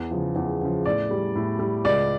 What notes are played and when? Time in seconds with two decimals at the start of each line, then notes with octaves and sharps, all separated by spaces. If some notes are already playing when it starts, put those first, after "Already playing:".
Already playing: E2
0.11 C#3 F3
0.36 E2
0.61 C#3 F3
0.86 A2 D5
1.11 G3
1.35 A2
1.59 G3
1.84 C#2 D5